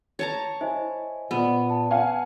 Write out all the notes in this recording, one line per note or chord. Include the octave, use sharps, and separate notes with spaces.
C#5 A5 A#5
E4 C5 D#5 G#5
A#2 B3
A5
F5 F#5 G#5